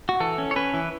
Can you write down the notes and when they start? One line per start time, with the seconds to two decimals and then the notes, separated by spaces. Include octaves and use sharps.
0.09 F#4
0.20 E3 A4
0.38 C#4
0.51 C#5
0.56 C#4 B4
0.74 E3